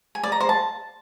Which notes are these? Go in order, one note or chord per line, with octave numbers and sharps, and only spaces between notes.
G#5
D5
A#5
C5
A5